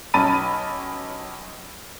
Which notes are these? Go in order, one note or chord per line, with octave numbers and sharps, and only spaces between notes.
B1 C#4 A5 B5 A6 D#7